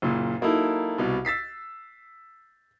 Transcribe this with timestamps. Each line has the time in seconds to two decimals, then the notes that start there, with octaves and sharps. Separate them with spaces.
0.02 F#1 A#2
0.41 F#3 A#3 D#4 E4 A4
0.98 C2 B2
1.25 E6 A6 B6 C7